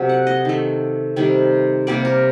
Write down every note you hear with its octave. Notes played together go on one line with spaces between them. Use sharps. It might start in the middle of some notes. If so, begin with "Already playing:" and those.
Already playing: C3 F#3 A3
F#5
D#5
D#3 A3
C3 D#3 G3
C3 G3 A#3 D5
A#4